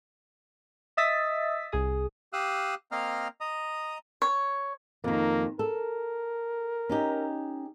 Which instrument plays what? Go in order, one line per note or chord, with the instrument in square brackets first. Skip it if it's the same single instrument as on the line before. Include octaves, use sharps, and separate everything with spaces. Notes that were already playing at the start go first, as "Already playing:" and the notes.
[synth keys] D#5 E5 D#6 E6 A6 B6
C2 G#4 D#6
[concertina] G4 F5 D#6 E6 F#6
A#3 C4 D#5 F5 A#5 F6
D#5 A#5 D#6
[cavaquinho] C#5
[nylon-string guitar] F2 D#3 [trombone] A#3
[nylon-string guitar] A4 [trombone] A#4
[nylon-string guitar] C#4 D#4 G4